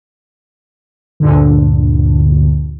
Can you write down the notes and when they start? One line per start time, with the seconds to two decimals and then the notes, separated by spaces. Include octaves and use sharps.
1.20 D2 G2 A#2 D3